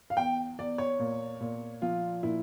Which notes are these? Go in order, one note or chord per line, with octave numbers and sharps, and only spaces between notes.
F5
E2 G5
E2 D5
C#5
A#2
A#2
F3 F4
A#2 E4